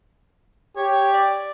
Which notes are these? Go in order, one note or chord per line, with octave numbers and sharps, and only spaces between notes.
G4 C#5
D5